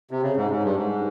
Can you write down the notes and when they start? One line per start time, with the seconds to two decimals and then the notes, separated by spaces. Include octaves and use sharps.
0.11 C3
0.22 C#3
0.37 G#2
0.51 G#2
0.63 G2
0.76 G#2